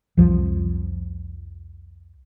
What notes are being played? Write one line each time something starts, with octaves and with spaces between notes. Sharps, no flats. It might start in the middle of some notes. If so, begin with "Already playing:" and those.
C2 F2 F3